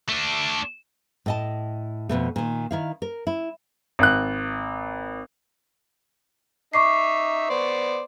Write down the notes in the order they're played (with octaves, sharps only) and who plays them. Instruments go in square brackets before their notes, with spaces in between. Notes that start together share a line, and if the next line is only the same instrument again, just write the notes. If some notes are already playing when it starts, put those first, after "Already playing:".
[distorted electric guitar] A3 D4
[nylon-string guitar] A2 D#5 A5
F2 G#2 B2 A3
A#2 D#3
D#3 E4 F5
A#4
E4
[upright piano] G#1 F#6
[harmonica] D#4 E5 [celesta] C#6 D6 C7
[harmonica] B3 C5 D5